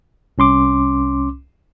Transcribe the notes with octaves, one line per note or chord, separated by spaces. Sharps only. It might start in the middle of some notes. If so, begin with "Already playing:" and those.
C2 C#4 C6 D6